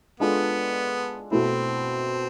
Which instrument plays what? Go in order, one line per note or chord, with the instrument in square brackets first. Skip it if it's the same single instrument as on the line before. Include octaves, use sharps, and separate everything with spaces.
[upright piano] G#3 D4 F4 A4 [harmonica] B3
[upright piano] B2 A3 E4 [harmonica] C4